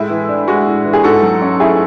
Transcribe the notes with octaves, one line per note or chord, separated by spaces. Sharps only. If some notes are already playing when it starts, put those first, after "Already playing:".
Already playing: A2 G#3 E4
E3
D4
G#3 F#4
A2
E3
G#4
G#2 F#4 A4
F#3
C#4
A3 E4 G#4